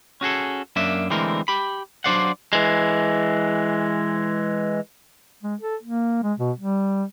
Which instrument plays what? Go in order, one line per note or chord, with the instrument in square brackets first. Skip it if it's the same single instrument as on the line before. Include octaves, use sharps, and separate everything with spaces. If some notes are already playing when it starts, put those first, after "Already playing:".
[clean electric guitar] C#4 F#4 G#4 A4
F#2 A#3 D4 E5
D3 E3 G#3 A3 C4 A#4
G4 B5
F#3 D4 C5 D5 F5 F#5
[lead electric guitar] E3 G#3
[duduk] G#3
A4
A#3
G#3
B2
G3